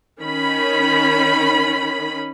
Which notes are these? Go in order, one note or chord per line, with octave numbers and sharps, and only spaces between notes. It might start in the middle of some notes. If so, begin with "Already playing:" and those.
D#3 C#4 B5